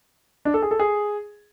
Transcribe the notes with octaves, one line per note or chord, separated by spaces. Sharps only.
D4
A4
G#4
A4
G#4